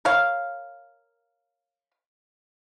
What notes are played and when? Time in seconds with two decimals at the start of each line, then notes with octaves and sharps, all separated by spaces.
0.05 A#4 C#5 F5